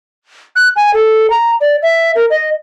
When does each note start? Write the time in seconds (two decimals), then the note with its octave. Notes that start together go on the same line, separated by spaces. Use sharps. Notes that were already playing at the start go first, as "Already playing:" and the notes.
0.56 F#6
0.76 G#5
0.94 A4
1.30 A#5
1.61 D5
1.83 E5
2.15 A#4
2.30 D#5